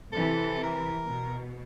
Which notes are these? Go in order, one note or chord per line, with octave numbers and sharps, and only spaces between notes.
C3 E3 A4
A#4
B2